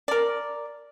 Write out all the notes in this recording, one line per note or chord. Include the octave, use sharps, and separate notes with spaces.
A#4 D5